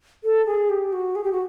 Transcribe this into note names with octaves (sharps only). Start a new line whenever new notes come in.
A4
G#4
G4
F#4
G#4
G4
F#4